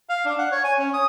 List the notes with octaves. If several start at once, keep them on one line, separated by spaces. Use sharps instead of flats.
F5
D4
F#5
C#5
G#5
C#4
D#6